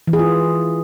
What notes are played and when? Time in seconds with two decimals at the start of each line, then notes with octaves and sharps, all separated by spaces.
0.07 E3
0.13 G#4
0.19 F4